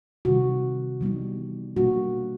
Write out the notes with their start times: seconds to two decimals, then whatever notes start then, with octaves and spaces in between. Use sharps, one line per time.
0.25 C3 D#3 G3 F#4
1.01 E3 G3 B3 D#4
1.76 B2 G3 A#3 D4 F#4